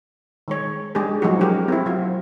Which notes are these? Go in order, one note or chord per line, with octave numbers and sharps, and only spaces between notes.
D#3 G#3 C#5
G#3 D4 G4 G#4
F3 F#3 G#3 A3 D#4 F#4
C#4 G4 A#4
C4 E4
F#3 F4 F#4